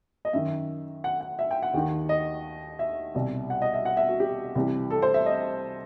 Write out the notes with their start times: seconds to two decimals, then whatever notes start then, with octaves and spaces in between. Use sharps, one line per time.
0.25 D#5
0.33 F#2 D#3 E5
1.04 F#5
1.21 F#5
1.39 E5
1.51 G5
1.62 F#5
1.74 D#2 D#3
2.09 D#5
2.79 E5
3.14 C2 B2
3.50 F#5
3.62 D#5
3.74 E5
3.85 F#5
3.97 E5
4.09 F#4
4.20 G4
4.55 C2 C3 E3
4.91 A4
5.02 C5
5.14 E5
5.26 D#5